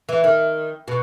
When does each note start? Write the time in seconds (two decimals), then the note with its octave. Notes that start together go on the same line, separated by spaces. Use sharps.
0.09 E3
0.24 D#3
0.88 B2